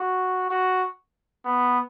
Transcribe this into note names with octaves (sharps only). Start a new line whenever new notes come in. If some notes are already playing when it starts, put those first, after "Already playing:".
Already playing: F#4
F#4
B3